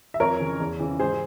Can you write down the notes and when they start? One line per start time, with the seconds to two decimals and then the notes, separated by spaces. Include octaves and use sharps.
0.14 E5
0.20 F2 A#4 C#5
0.39 C#3 E3
0.60 E2
0.79 C#3 E3
0.99 G#2 G#4 C5